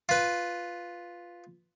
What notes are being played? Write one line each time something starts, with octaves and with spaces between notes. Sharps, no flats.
F4 B4